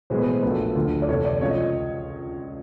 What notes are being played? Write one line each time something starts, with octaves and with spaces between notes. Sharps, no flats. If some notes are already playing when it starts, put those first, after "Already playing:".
B1 A2 E3 G#3 B3 C5
B4
C5
A#1 A#2 F#3 A3 B4
D2 D3 F3 A3
D5
F2 C3 E3 A3 C#5
D5
C#2 C3 F3 C#5
D#5